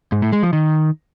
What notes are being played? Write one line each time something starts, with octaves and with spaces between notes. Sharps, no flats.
G#2
A2
G#3
F3
D#3